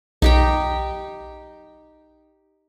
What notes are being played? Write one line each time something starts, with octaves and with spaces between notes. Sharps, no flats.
B1 D#4 G4 G5